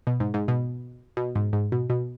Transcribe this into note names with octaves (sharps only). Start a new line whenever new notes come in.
B2
G#2
G#2
B2
B2
G#2
G#2
B2
B2